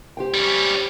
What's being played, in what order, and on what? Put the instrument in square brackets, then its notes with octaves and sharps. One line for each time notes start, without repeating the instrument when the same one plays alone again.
[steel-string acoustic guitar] G4 C5 G5
[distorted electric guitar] G3 C#4